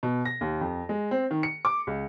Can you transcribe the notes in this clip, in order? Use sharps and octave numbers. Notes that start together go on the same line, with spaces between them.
B2
A#6
D#2
F2
G#3
C4
D#3
C#7
D6
C#2